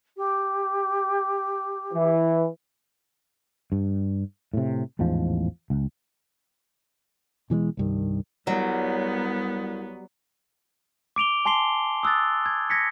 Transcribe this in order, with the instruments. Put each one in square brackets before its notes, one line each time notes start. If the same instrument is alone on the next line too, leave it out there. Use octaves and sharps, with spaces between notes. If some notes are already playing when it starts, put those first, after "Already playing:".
[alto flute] G4
[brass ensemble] E3
[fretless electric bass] G2
A2 C3
A1 E2 G#2 F3
C#2
[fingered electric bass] B2 E3 F3 G#3
C2 G2 D#3
[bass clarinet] C2 [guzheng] F#3 [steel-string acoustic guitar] G3 [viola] B3
[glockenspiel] D6 D7 F7 G7
G#5 A5 C6 C7 G7
D#6 E6 F#6 A6
G#6
G#6 A#6 B6 C#7